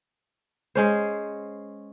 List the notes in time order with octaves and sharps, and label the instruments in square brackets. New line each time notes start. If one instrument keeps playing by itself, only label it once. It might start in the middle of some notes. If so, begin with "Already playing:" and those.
[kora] G#3 C#4 C5